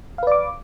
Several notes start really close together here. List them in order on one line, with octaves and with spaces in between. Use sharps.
F5 B4 D5 D6